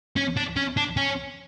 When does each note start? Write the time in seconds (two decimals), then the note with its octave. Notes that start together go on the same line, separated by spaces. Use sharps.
0.16 C#4
0.37 D4
0.57 C#4
0.77 D4
0.97 C#4